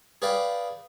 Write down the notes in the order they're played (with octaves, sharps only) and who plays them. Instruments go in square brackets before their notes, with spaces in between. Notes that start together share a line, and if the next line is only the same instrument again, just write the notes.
[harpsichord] G#4 B4 D5 F5 G5